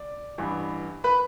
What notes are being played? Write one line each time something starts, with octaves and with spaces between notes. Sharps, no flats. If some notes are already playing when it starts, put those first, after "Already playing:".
Already playing: D5
A1 G2 E3
B4 B5